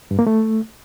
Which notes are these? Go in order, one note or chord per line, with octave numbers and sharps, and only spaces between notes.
G2
A#3
A3